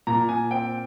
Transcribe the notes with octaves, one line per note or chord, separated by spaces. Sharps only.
A#2 A#5
A#2 G#5
C4 G5